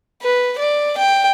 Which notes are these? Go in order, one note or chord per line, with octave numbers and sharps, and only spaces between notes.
B4
D5
G5